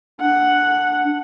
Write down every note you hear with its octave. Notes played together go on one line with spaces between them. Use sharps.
D4 F#5